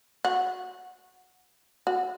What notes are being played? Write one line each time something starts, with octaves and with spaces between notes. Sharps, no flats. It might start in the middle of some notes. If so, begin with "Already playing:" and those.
F#4
F#4